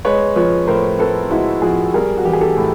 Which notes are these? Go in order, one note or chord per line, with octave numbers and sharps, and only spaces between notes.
G#3 B4 C#5
F3 B4 C#5
A2 A#4 C5
A2 A4 B4
G#3 E4 F#4
F3 F#4 G#4
G3 G#4 A#4
F#4
E3 G4
G#4
G4 A4
A2